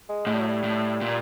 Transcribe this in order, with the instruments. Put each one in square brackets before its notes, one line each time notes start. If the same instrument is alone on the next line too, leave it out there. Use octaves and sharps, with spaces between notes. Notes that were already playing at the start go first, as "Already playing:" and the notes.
[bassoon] G#3
[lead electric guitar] A2 [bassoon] G#3
[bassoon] G3
F#3
G3
[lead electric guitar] A2
A#2